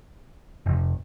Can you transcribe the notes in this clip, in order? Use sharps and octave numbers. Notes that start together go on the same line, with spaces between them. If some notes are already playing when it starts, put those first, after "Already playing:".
F1